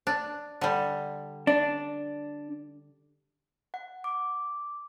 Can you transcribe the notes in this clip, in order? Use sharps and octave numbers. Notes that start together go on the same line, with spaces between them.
D4
D3 G3
D4
F#5
D6